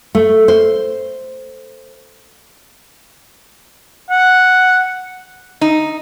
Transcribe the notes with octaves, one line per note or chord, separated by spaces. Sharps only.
A3
C5
F#5
D#4